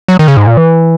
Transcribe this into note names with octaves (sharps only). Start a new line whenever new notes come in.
F#3
D#3
C#3
G#2
A#2
E3